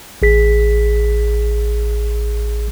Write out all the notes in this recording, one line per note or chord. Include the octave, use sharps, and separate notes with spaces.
A1 G#4 B6